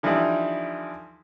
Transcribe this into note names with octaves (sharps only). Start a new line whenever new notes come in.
D3 E3 F3 G3 D#4 E4